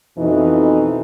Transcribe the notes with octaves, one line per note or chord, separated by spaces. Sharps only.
F2 B2 E3 D#4